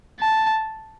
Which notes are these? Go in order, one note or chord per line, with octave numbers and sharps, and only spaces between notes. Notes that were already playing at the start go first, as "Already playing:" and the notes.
A5